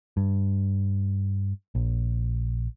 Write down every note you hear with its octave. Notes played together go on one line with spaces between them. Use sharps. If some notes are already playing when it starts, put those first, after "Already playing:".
G2
A#1